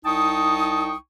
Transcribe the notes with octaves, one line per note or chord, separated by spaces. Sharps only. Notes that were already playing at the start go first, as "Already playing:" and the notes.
C2 D#4 G5 A5 C#6 D#6